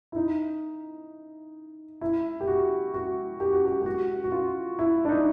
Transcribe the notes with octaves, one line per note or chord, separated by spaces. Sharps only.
E4
D#4
E4
G4
F#4
F#4
G4
F#4
G4
G4
F#4
F#4
F4
E4
D4
D#4